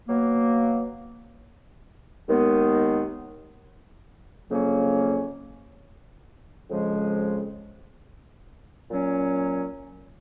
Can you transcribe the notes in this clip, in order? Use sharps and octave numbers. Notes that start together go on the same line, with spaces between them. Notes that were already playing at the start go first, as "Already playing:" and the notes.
B2 F#3 A#3
D#2 D#3 G#3 B3
F2 C#3 F#3 A#3 C#4
F2 C#3 F3 G#3
A#2 F#3 C#4